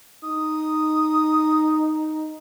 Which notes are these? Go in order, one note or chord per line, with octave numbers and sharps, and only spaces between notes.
D#4 D#6